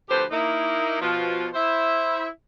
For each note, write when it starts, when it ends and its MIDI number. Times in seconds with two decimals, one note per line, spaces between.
0.10 0.24 38
0.10 0.24 53
0.10 0.24 57
0.10 0.24 67
0.10 0.24 71
0.10 0.24 72
0.31 0.98 58
0.31 0.98 63
0.31 0.98 64
1.02 1.48 47
1.02 1.48 53
1.02 1.48 65
1.54 2.26 64
1.54 2.26 72
1.54 2.26 76